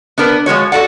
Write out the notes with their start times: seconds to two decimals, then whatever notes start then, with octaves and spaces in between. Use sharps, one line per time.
0.18 B3 D4 A#4 B4
0.46 F3 G#3 F#4 C#5
0.72 F#4 A4 D5 F#5